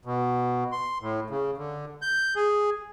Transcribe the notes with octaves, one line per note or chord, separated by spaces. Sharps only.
B2
C6
A2
C#3
D3
G6
G#4